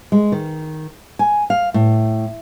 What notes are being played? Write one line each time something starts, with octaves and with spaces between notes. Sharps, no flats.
G#3
D#3
G#5
F5
A2